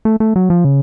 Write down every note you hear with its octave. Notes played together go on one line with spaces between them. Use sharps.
A3
A3
F#3
F3
C#3